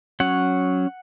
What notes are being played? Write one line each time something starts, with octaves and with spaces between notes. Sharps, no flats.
F#3 C#4 F#5